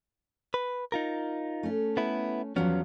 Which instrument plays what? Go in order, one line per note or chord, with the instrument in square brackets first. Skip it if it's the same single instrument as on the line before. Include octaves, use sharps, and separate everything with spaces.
[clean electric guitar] B4
D#4 F4 A#4
[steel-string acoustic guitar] A3 C#4
[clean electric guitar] B3 E4
[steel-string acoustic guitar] E2 F3 F#3 [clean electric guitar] B3 C#4